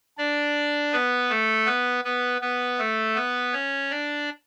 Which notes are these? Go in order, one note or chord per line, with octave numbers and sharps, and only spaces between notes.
D4 D5
B3 B4
A3 A4
B3 B4
B3 B4
B3 B4
A3 A4
B3 B4
C#4 C#5
D4 D5